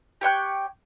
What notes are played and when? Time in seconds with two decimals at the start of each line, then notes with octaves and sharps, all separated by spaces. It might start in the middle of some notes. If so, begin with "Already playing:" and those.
0.21 G4 C#5 G5 F#6